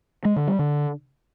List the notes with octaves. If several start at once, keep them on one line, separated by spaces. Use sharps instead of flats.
G#3
D3
G3
D3